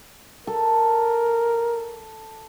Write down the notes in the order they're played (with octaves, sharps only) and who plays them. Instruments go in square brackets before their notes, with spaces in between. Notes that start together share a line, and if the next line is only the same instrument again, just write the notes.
[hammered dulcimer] A4 [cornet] A#4